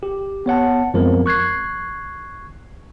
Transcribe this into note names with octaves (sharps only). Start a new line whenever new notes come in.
G4
B3 C#5 F#5 A5
F#2 F3 G#3 B3 C4 A#4
C#6 F#6 G#6 C7